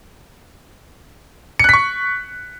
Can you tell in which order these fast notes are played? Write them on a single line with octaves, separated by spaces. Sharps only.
C#7 F#6 B6 C#6